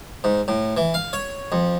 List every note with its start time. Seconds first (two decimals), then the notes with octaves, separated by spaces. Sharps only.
0.24 G#2
0.48 A2
0.77 E3
0.94 F5
1.13 C#5
1.52 F2